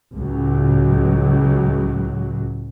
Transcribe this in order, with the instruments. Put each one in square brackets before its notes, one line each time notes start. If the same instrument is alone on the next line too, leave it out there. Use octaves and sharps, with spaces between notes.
[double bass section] C#2 A2 F#3